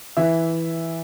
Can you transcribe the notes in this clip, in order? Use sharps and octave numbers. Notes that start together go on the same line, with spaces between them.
E3 E5